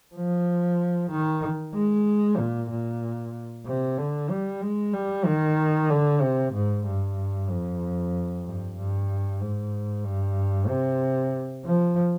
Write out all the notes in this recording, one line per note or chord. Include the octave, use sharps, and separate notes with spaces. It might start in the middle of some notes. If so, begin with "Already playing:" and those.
F3
D#3
G#3
A#2
A#2
C3
D3
G3
G#3
G3
D#3
D3
C3
G#2
G2
F2
G2
G2
G#2
G2
C3
F3